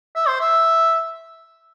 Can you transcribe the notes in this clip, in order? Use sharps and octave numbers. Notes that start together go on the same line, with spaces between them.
E5
C5
E5